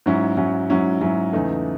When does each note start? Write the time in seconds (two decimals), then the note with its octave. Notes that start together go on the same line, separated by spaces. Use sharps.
0.06 G#2 F#3 C#4 E4
0.37 G#2 F#3 C#4 E4
0.70 G#2 F#3 C#4 E4
1.01 G#2 F#3 C#4 E4
1.33 E2 C#3 E3 A3 D#4